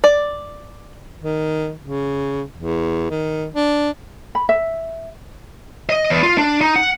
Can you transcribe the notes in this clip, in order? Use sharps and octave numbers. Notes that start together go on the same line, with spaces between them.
D5
D#3
C#3
E2
D#3
D4
B5
E5
D#5
E2
F4
D4
D#4
F#5